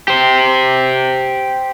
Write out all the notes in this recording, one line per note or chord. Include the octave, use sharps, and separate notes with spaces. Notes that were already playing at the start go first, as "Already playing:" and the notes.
G4 C5